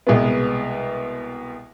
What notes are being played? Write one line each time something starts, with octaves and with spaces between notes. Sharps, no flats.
C2 B2 G#3 B3